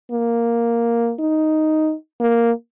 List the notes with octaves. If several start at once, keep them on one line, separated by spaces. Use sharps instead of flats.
A#3
D#4
A#3